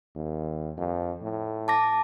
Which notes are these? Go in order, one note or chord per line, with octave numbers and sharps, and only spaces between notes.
D#2
F2
A2
A5 D6 A#6